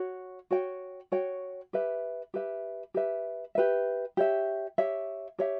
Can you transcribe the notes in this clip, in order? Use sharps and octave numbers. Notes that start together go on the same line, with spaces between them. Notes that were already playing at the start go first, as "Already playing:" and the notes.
Already playing: F#4 C#5
F#4 C#5 G5
F#4 C#5 G5
G4 B4 E5
G4 B4 E5
G4 B4 E5
G4 B4 E5
G4 C#5 E5
G4 C#5 E5
G4 C#5 E5